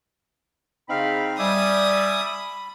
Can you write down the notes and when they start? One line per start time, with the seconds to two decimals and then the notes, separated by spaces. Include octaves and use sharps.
0.89 C#3 C4 D#4 F5 B5
1.39 G3 E5 G#5 D6 D#6
2.26 B5